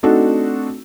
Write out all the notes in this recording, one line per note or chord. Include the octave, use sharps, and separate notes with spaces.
A3 C4 D4 D#4 F#4 A4